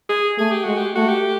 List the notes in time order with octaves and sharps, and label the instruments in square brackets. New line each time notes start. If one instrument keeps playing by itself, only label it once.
[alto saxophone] G#4
[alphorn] A3 [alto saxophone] G#4
[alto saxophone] G4
[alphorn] G#3 [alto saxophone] F#4
[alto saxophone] G4
[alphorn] A3 [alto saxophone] F#4
[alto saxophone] G4